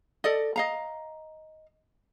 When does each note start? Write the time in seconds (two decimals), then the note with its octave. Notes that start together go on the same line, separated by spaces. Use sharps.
0.24 A4 D5 D#5
0.56 D#5 F5 A#5